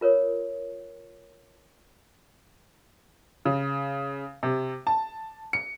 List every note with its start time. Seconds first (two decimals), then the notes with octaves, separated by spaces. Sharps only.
0.01 F4 A#4 C#5 D#6
3.45 C#3
4.43 C3
4.87 A5
5.53 C#7